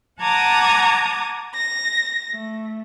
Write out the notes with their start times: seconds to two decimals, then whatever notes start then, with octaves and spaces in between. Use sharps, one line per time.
0.21 F#5 A5 A#5 D6 D#6 G#6
1.54 A#6
2.30 A3